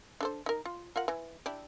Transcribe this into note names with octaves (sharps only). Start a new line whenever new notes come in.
D4 A4 C5
D#4 A#4
F4
F4 A#4 F#5
E3
D4 E4 G4